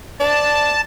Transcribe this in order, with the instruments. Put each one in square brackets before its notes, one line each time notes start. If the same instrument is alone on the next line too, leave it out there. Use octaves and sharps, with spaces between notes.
[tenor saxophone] D5 [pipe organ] A5